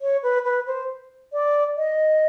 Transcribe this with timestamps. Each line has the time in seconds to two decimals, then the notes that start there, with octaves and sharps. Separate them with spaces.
0.01 C#5
0.23 B4
0.45 B4
0.67 C5
1.33 D5
1.77 D#5